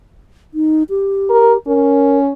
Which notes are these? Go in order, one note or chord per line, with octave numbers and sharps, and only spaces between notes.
D#4
G4
A#4
C#4 A#4